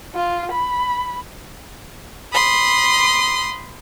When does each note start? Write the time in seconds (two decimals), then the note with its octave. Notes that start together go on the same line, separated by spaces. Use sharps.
0.15 F4
0.52 B5
2.32 B5 C6 D#6